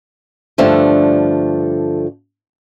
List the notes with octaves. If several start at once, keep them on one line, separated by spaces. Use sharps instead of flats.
G2 D3 F3 A3